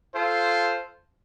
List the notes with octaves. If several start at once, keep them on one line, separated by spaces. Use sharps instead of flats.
F4 A4 C5